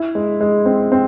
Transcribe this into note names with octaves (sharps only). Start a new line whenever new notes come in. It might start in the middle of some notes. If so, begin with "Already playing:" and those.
Already playing: E4
G#3
G#3
C4
C4